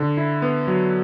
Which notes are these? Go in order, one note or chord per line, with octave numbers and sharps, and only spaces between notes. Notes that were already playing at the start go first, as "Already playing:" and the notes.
Already playing: D3
E4
B3
F#3